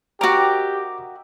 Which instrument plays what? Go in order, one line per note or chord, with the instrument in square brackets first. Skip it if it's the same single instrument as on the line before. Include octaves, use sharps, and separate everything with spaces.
[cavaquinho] F#4 A#4 [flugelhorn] G4 [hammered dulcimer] D#5 E5 G5 [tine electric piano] A#5 D6